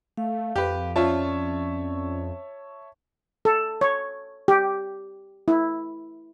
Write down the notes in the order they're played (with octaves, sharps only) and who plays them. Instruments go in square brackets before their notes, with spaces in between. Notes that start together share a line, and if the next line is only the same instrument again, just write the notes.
[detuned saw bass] A3 [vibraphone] F5
[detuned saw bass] F2 [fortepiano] G4 B4
[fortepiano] F3 F4 [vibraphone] C#4 D5 [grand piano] C#5 E5 A5
[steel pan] A4
C#5
G4
E4